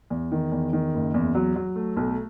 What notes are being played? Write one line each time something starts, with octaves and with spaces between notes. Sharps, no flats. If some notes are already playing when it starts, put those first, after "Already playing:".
E2
D#3
E2
D#3
F#1
E2
F#3
F#3
A3
B1